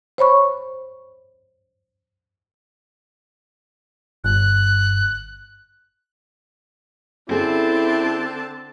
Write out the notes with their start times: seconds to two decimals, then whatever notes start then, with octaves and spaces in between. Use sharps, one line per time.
0.18 C5 C#5 B5 C#6
4.24 G1 F#6
7.29 D3 C4 C#4 E4 G#4 A4 A5